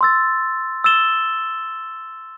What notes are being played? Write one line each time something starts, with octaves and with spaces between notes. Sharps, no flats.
C6 E6 A6
E6 A6 E7 G7